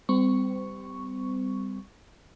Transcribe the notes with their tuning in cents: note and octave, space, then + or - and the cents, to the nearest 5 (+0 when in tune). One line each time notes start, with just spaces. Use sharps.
G3 +5 C4 -35 C#6 +0